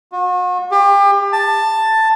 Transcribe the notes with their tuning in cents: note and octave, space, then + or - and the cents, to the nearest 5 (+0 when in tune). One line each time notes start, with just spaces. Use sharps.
F#4 -40
G4 +35
A5 +10